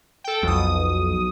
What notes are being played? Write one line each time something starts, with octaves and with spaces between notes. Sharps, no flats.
A4 G5
B1 F2 D#6